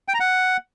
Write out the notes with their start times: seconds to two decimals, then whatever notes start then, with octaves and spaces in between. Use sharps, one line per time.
0.08 G5
0.14 A#5
0.20 F#5